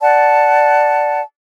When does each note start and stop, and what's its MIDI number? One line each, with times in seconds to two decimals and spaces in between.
0.01 1.21 74
0.01 1.21 78
0.01 1.21 81